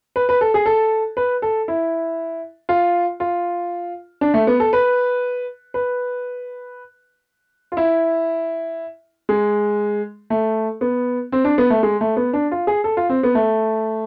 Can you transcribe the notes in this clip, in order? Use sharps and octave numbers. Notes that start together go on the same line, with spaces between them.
B4
B4
A4
G#4
A4
B4
A4
E4
F4
F4
D4
A3
B3
A4
B4
B4
F4
E4
G#3
A3
B3
C4
D4
B3
A3
G#3
A3
B3
D4
F4
G#4
A4
F4
C4
B3
A3